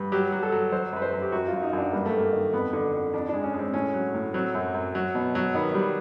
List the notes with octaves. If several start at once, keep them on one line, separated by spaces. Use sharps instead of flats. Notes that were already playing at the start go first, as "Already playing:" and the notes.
Already playing: G2
F#3 G4
F#3
A4
F#3
F#3 C5
F#2 B4
C5
F#3
G4
F#2 F#4
F4
F#2
D#4
F#2 D4
G2 A#3
A3
G2 A#3
D#3
F2 B3
D3
F2
F2 D4
G#3 D4
C#4
G#3
C4
A2 C#4
F#3
A2
F#3 C4
F#2
F#2
F#3
B2
F#3
D#3 B3
G3